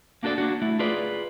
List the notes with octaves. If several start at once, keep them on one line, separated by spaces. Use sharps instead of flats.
A#3 D4 F#4 A4 D5
A#3 D4 F#4
A3 E4
F4 G#4 B4 D5